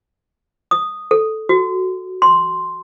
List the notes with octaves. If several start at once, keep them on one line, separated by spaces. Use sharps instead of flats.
D#6
A4
F#4
C6